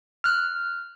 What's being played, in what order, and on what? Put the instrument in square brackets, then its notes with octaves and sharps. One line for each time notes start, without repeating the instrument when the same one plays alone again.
[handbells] F6 F#6